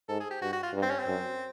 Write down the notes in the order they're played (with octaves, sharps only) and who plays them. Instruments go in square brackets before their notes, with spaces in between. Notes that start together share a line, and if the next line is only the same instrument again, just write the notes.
[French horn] G#2 [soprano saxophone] A4
[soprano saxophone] G#4
G4
[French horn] G2 [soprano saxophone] F#4
[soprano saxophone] F#4
F4
[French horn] G2
[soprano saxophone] C4
C#4
C4
[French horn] F#2